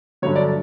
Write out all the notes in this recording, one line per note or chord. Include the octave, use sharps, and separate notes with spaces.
G1 G2 D3 F#3 C#5
D5